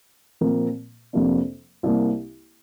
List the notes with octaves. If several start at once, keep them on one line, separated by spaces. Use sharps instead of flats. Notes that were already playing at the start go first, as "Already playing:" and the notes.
A#2 F3 C4 A#4
F2 C3 A#3 D4
C2 C3 A#3